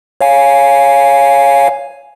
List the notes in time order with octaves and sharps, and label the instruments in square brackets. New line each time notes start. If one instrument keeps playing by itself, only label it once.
[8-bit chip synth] C#5 F5 G#5